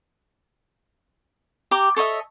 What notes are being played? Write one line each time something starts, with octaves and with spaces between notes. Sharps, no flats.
G4 A#5 D6
A4 C#5 D#5 E5